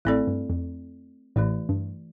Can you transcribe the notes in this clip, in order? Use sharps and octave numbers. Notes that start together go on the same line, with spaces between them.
A1 A2 A3 C4 E4 A4 D5
G2
F2
A1 A2 E3 A3 E4 G4 D5
G2